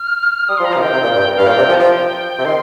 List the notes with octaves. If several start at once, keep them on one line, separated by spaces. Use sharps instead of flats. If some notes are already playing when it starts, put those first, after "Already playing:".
Already playing: F6
G3 D#6
F3 C6
A#5
F3
C3 F5
D#3 G5
C3
A#2
G2
G2 F5
A#2 G5
C3
F3
A#5
F3 G5
C3
D#3 C6